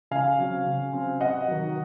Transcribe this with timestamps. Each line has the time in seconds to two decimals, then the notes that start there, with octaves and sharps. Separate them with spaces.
0.11 C#3 F5 G#5
0.39 F#3 C4
0.66 C#3
0.93 F#3 C4
1.21 C3 D#5 F#5
1.48 D#3 F#3